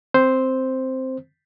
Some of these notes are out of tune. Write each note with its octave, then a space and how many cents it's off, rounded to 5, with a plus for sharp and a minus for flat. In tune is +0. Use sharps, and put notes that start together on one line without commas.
C4 +0 C5 +0